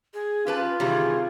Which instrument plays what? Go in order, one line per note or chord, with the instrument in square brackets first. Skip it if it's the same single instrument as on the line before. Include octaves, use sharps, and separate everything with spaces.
[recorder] G#4
[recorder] C#4 [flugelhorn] F4 [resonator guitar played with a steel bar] G4 B4 A5
[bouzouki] C3 [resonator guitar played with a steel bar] D#3 E3 G3 [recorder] G#4